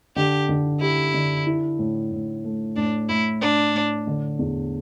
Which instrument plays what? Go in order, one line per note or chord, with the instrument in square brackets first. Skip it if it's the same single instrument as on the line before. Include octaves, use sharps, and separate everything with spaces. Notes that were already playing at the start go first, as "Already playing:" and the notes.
[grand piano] D3 [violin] G4
[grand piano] D3
[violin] E4 [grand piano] G4
[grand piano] D3
E4
A2
A2
A3
[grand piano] A2 [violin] D4
[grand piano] A2 [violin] E4
[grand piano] A2 [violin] D4
[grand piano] A2
D3
E2